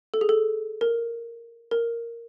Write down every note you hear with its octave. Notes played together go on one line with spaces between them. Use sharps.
A4
G#4
A4
A#4
A#4